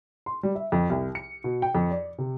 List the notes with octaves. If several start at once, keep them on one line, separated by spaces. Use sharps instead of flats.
C6
G3
E5
F2
C2
C#7
B2
G5
F2
D5
C3